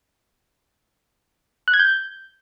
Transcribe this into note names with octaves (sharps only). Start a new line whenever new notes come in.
F#6
G#6
G6